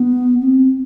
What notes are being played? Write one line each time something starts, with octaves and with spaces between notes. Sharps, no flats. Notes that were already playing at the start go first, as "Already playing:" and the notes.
Already playing: B3
C4